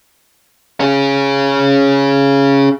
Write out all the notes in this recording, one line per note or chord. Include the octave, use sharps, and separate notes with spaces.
C#4 G#4